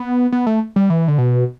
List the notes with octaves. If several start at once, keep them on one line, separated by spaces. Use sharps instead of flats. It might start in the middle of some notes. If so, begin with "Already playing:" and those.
Already playing: B3
B3
A3
G3
E3
D3
B2